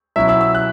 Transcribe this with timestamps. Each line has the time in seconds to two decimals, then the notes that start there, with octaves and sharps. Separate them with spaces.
0.16 B2 F#3 C#4 E4 E5
0.29 E6
0.41 E6
0.55 F#6